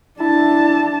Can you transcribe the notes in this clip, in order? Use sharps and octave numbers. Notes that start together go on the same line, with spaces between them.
D4 E4 A5